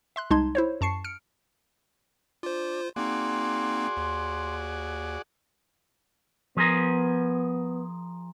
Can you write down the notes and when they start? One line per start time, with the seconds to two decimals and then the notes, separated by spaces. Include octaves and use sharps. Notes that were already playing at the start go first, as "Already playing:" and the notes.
0.16 E5 C6 F#6
0.30 C2 G#3 D#4 A5 C6 G#6
0.55 E4 C5 C#5
0.81 F#2 A5 C#6 C7 C#7
1.04 F6 C#7 D7
2.43 D4 F4 C5
2.96 A#3 C4 D#4 F#4 G#4 D5 C6
3.97 D#2
6.57 F3 B3 G#4 A#4